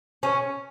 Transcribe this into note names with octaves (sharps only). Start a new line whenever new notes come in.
C#4